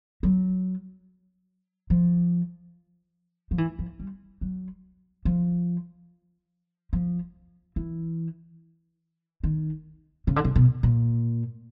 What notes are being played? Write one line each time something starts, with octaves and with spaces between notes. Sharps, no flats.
F#3
F3
F3
E3
F3
G3
F#3
F3
F3
E3
D#3
C#3
D3
C#3
B2
A#2